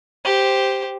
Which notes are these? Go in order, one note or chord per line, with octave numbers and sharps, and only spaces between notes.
G4 C5